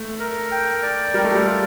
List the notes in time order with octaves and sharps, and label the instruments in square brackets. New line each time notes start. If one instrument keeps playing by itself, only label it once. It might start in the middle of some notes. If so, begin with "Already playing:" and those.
Already playing: [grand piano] A3
[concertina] A#4
G5
D5
[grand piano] G3 [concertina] A#4
[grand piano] A3
G3
[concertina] F4